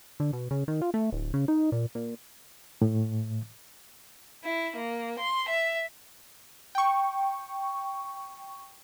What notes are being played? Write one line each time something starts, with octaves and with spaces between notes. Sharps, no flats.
D3
B2
C#3
D#3
F4
A3
D1
C#3
D#4
A#2
A#2
A2
E4
A#3
C6
E5
G5 C#6